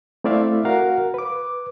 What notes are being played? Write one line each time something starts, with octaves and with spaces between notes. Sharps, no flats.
A3 C4 E4 D5 E5 F5
F#4 A#4 F5 F#5
B4 D6